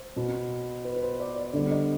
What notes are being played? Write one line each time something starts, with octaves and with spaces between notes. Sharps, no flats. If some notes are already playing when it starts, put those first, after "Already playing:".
Already playing: C5
B2 B3
B4
B4
C5
D5
D5
D3 G3 B3 D5
D#5